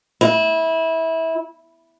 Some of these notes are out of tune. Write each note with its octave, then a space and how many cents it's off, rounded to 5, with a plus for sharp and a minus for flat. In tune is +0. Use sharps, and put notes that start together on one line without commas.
E4 -20